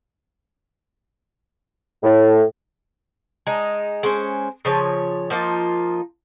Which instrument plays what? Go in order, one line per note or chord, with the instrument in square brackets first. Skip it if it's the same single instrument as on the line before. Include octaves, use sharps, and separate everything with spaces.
[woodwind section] A2
[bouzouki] G#3 D#4
G#3 C#4 C5
C#3 F3 C#5
F3 A#3 D#4 F4